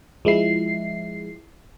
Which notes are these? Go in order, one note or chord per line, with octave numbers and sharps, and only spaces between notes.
F3 G#3 E4 C7